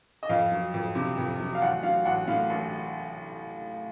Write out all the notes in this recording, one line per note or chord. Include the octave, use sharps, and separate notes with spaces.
D#5
F2 F5
F#3
F2
C3
F2
F#3
F5
A1 F#5
F#3 F5
A1 F#5
A2 F5
A1